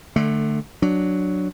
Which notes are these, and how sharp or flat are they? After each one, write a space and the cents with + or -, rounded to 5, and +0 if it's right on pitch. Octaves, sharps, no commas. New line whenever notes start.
D3 +20 A3 +0
F#3 +0 D4 +0